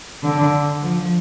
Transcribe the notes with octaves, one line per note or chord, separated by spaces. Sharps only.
D3
F3